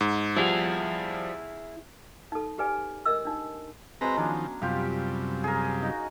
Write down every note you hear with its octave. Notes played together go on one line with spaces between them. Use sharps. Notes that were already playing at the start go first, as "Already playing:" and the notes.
G#2
F3 G3 E4 G#4
D#4 A4
G4 G#4 B4 D5 G#5
A#4 D#5 E6
D4 D#4
F#3 G#3 C4 B4 A#5
D#3 F3 B3 C#4 D4
F#2 C3 G3 F4 G4 F5
G#4 A#4
D#4 F#4